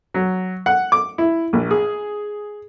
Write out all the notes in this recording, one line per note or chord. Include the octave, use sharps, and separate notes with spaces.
F#3
F#5
D6
E4
A#1
G#4